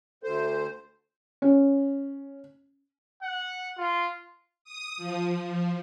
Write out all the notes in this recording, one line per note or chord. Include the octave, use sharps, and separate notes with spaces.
D2 A4 C5
C#4
F#5
F4
D#6
F3
F3